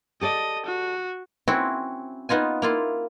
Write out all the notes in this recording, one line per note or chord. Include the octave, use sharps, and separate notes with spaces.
G4 A4 D5 D#5
F#4
C4 C#4 E4 F#4
B3 D#4 F4 G#5
A#3 E4 F4